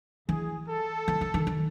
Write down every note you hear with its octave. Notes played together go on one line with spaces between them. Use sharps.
E3 G#4
A4
E3
D#3
D#3
D#3